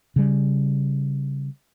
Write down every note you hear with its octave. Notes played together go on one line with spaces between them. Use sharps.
C#3 G3